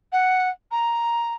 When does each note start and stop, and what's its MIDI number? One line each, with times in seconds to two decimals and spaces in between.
0.12 0.49 78
0.71 1.35 82